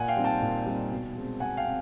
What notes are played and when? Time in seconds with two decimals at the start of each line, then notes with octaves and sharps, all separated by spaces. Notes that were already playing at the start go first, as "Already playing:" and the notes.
Already playing: A#2 F#5 G#5
0.08 F5 G5
0.17 G3 C4 D#4
0.24 G5 A5
0.42 A#2
0.66 G3 C4 D#4
0.91 B2
1.15 G#3 C4
1.40 B2 F#5 G#5
1.57 F5 G5
1.65 C4